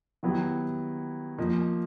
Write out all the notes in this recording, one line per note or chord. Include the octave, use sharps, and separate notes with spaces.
D#3 F#3 B3 E4 G4
F3 A#3 D#4